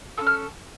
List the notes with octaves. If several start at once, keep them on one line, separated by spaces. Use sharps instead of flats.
C#4 F4 A4 E6
F6